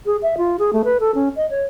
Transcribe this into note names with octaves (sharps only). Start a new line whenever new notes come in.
G#4
E5
F4
G#4
A3
B4
A4
C#4
D#5
C#5